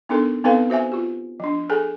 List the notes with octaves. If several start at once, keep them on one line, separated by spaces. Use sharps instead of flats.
B3 D4 D#4 A4 A#4
B3 C4 D#4 A4 B4 F5
F#4 C5 E5 G#5
F4 G4
F3 D4
G#4 A4 G#5